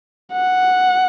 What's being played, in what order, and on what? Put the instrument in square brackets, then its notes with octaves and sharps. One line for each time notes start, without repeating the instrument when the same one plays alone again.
[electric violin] F#5